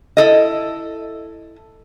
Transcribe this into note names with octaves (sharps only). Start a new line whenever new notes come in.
E4 A4 D#5